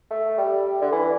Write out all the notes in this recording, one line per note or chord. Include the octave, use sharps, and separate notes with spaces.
A3
G3
D3
E3